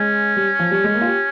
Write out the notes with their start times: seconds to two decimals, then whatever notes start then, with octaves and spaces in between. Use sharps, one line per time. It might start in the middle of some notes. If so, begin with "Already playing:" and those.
Already playing: G#3 C#4
0.36 G3
0.59 F3
0.71 G3
0.84 G#3
0.93 A#3
1.01 F4
1.06 G4